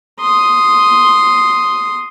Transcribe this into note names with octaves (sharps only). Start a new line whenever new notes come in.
C6 D#6